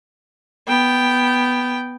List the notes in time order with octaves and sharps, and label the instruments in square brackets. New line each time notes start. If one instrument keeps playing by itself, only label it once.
[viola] B3 G5